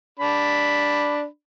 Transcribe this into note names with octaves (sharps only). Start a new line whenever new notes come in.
D4 B5